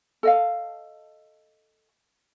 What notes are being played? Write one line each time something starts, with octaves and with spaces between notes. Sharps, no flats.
A4 D#5 F5